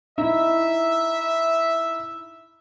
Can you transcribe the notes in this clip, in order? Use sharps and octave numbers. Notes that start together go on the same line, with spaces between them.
D#4 E4 E5